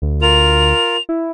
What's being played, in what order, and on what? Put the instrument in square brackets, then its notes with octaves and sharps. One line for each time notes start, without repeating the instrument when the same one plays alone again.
[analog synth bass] D2
[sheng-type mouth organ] F4 A#4 [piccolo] F7
[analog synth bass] E4